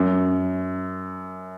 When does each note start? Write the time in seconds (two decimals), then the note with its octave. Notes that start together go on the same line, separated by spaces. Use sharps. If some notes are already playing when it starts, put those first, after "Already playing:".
Already playing: F#2